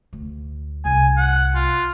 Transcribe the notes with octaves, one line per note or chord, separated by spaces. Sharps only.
D2
C2 G#5
F#5
F4